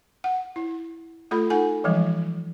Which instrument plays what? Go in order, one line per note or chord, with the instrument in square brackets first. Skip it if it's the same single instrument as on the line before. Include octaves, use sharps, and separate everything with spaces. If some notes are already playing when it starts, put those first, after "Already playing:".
[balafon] F#5
E4
A3 F4 A4 B5
D#4 A4 F#5 G#5
E3 F3 G3 G#3